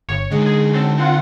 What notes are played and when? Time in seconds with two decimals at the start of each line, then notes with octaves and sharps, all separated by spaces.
0.09 G1 C#5
0.31 D3 G#3 D#4
0.46 G#4
0.74 F#3 C4 A4
0.98 C4 F4 F#5